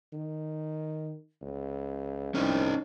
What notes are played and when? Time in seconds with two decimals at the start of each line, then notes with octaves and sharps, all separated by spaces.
0.13 D#3
1.42 C#2
2.35 C2 C#4 D#4